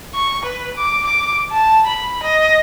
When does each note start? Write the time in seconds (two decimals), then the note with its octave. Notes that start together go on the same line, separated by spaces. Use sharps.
0.14 C#6
0.45 B4
0.77 D6
1.06 D6
1.52 A5
1.87 B5
2.23 D#5